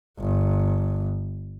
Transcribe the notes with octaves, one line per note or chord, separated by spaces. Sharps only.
G1